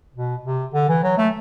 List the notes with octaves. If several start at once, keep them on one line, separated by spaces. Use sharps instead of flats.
B2
C3
D3
E3
F#3
A3